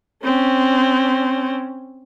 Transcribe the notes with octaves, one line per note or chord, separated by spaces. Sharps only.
C4 C#4